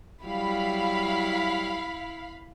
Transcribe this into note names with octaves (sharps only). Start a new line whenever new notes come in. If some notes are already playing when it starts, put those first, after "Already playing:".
F#3 G3 E4 F5 B5